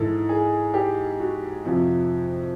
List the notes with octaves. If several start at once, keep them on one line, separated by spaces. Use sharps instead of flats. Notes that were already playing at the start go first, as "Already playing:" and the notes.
Already playing: G#2 E3 A4
G#4
G4
F#4
F2 C3 F3